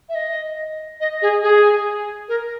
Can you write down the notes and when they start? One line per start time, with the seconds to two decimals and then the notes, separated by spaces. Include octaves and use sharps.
0.09 E5
0.15 D#5
1.00 D#5
1.22 G#4
1.43 G#4
2.29 A#4